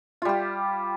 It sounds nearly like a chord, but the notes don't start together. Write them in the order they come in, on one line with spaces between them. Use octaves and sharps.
F4 G3 G4